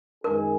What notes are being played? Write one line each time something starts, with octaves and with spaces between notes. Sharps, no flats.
F#2 D#3 G#3 D#4 G#4 A#4